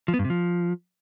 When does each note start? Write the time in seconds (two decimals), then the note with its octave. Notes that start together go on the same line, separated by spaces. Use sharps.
0.08 F3
0.14 B3
0.19 G2
0.24 C3
0.30 F3